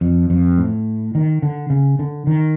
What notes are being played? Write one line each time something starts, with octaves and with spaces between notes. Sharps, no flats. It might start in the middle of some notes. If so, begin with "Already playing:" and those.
F2
F2
A2
D#3
D3
C#3
D3
D#3